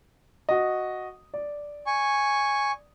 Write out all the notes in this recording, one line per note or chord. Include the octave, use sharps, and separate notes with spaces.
F#4 D#5
D5
G#5 C#6